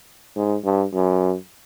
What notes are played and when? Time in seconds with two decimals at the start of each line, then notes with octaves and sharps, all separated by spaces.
0.36 G#2
0.65 G2
0.94 F#2